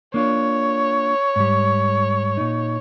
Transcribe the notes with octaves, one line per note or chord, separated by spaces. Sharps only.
A#3 D4 F4 C#5
G#2 G3
A#2 D#4